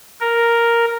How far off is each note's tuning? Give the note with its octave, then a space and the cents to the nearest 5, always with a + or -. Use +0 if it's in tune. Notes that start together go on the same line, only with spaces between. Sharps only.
A#4 +0